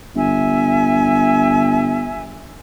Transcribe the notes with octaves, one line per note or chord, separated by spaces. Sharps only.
G1 E5 G#5